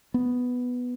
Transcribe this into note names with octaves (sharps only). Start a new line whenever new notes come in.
B3